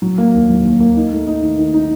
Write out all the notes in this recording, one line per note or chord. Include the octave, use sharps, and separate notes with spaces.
F#3
A#3
D#2
F#3
D#2
A#3
D#4
A3
D#4
D#3
D#3
D#4